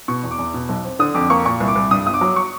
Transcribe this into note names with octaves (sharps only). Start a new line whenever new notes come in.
B2 C#6
E2
D6
E2
B2
B1
C4
D3 D#6
F2 D6
A#3 C#6
A#2 C#6
C2
D6
C2
G2 D#6
G1 D#6
D6
F#3
C#6